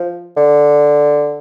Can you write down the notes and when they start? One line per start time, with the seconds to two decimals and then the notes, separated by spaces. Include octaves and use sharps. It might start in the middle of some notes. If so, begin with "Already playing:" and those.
Already playing: F3
0.37 D3